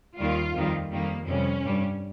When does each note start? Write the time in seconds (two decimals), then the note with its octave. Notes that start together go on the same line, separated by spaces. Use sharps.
0.17 D#2 D#3 G3 F4
0.54 F2 D#3 G3
0.91 F2 D#3 G3 A#3
1.27 F2 C3 G3 C#4
1.64 G2 G3